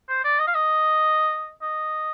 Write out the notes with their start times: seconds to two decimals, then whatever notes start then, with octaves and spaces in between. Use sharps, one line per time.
0.09 C5
0.24 D5
0.39 D#5
0.47 F5
0.55 D#5
1.62 D#5